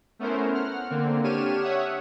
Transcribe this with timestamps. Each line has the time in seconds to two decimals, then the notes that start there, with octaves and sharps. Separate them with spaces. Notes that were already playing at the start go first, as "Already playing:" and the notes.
0.19 A3 B3 C#4 E4 A#4 C5
0.54 F#5 F6
0.90 D3 A#3 C4
1.23 D4 G4 C#5 F6 D#7 E7
1.62 C#5 E5 F#5 D#6